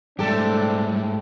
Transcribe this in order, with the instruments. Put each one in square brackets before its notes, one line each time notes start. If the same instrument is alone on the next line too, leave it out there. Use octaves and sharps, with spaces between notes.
[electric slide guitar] G#2 A3 [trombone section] C3 C4 D4 [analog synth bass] G3 [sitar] G4 A4